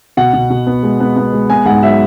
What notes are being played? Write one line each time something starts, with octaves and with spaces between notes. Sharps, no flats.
B2 F#5
B2
B2
B3
G#3
B3
B3
G#3
B3 G#5
G#2 F#5
F#3 E5